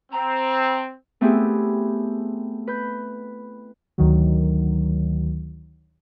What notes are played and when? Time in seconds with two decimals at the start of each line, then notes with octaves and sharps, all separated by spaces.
0.12 C4 A#5
1.21 A3 B3 C4 E4 G4 G#4
2.67 B4 G6
3.98 D2 D#3 F#3